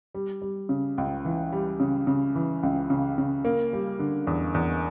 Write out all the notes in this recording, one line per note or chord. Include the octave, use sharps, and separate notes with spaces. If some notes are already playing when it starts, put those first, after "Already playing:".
G3
G3
C#3
C#2
E3
G3
C#3
C#3
E3
C#2
C#3
C#3
A#3
G3
D3
E2
E2